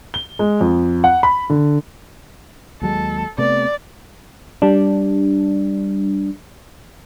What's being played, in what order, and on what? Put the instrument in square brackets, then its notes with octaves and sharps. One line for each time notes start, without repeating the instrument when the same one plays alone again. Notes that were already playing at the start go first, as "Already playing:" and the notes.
[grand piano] G7
G#3
F2
F#5
B5
D3
[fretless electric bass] D#2 F#3 G#3 [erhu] A4
[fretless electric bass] C3 A3 B3 [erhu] D5
[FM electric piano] G3 D4